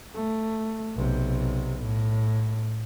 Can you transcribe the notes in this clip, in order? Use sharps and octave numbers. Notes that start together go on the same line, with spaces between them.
A3
B1 C3
A2